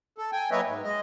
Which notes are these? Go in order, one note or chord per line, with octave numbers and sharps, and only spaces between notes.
A4
G5 G#5
F#3 A#3 B4 C#5 D#5 E5
G#2
G#3 D#5